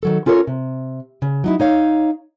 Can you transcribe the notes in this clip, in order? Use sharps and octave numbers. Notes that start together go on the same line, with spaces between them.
D#3 F#3 A4
C#4 F4 A4 A#4 C#5
C3
C#3
F#3 D#4 E4
D#4 C#5 F5